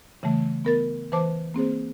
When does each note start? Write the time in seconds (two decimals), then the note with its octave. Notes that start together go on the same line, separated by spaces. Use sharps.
0.23 C#3 E3 G3 A3
0.65 B3 A#4 A6
1.12 E3 B4 C5 A5 D6
1.54 A#3 C4 G#4 C5